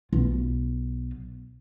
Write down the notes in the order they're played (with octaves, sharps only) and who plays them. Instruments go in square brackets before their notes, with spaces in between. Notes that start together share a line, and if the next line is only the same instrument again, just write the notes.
[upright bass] B1 F4